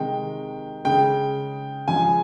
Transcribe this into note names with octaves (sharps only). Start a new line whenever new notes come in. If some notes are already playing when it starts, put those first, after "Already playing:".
Already playing: C3 D#3 G#3 G5
C#3 G#3 G5
C#3 F3 G#3 G#5